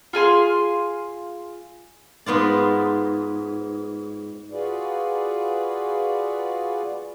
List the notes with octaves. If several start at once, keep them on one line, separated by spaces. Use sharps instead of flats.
F4 G#4 G#5 C6
G#2 B3 F4 D5
F4 F#4 G#4 B4 D5